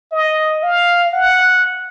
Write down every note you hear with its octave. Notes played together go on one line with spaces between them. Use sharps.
D#5
F5
F#5